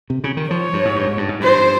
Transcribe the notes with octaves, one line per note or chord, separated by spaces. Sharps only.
C3
C#3
D#3
F3 C#5
G2
G#2
G2
G#2
G2
G#2
G2 C5